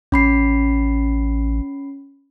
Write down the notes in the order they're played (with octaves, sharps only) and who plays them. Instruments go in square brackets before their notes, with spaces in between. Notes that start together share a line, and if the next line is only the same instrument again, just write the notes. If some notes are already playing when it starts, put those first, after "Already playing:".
[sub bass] A1 [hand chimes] C#4 B5 C7